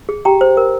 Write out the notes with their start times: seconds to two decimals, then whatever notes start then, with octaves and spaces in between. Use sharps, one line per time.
0.09 G#4
0.25 G4 G5 A#5
0.41 C5
0.57 A#4